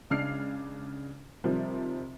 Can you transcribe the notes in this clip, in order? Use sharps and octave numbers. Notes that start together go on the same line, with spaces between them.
C#2 C#3 D4 F6 C7
C3 D#3 F3 G3